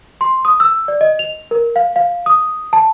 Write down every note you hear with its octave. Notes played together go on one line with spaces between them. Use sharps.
C6
D#6
E6
D5
D#5
F7
A#4
F5
F5
D#6
A5